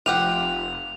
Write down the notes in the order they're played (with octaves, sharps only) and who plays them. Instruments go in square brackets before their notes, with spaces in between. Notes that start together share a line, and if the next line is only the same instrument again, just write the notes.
[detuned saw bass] F1 [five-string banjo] F4 G4 F#5 [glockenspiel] F7